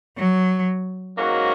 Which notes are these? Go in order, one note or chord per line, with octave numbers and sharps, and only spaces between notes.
F#3
G#2 F#3 A#3 C#4 F#4